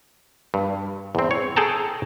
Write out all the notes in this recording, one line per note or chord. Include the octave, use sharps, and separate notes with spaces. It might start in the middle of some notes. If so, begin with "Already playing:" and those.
G2
E2 C4
C#5
G#4 A4 G5 A5 A#5